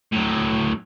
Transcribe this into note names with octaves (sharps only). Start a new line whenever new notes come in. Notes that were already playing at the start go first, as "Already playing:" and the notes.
A2 F#3